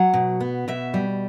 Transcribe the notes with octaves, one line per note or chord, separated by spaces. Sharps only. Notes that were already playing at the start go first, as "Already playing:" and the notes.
Already playing: F#3 F#5
B2
B3
B2 E5
G3